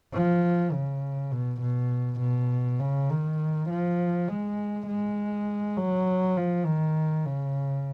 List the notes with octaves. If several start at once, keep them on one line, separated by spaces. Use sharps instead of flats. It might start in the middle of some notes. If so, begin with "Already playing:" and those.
F3
C#3
B2
B2
B2
C#3
D#3
F3
G#3
G#3
F#3
F3
D#3
C#3